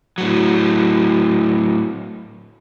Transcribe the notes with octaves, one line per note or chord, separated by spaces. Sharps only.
A2 F#3